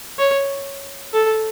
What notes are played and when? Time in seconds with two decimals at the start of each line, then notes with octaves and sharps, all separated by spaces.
0.19 C#5
1.13 A4